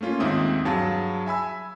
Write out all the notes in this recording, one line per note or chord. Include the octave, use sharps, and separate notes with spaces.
A3 A#3 C#4 F4
D#2 G#2 C4 E5 D#6
G2 F#3 G#4 F5 A5
E5 G#5 B5 E6